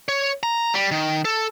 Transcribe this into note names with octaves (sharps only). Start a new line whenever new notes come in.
C#5
A#5
G3
D#3
A4